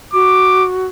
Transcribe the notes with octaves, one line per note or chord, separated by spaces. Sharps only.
F#4 D6